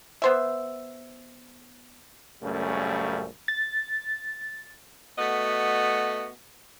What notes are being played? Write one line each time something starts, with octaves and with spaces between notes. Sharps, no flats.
B3 C5 E5
A#1 F#2 C#3 G3 A3
A6
A3 B3 F#4 D#5